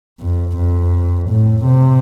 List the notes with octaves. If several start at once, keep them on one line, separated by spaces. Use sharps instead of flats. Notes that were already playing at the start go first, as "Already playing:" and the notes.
F2
F2
A2
C3